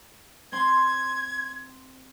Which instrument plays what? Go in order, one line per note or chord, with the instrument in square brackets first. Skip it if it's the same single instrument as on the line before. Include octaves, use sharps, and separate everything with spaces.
[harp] C4 C6 [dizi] G#6